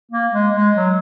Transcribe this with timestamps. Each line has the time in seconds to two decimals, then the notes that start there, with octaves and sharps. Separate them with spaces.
0.11 A#3
0.32 G#3
0.55 G#3
0.75 F#3